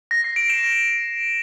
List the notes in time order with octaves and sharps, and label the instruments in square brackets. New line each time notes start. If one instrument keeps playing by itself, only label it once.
[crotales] A#6
C7
D7
E7